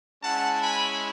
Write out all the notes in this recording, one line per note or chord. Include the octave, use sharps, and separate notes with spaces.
G#3 C#4 E4 F#5 A5
G#5 B5